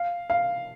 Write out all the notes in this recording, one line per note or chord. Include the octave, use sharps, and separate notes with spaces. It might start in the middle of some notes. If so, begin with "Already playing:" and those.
Already playing: F5
F5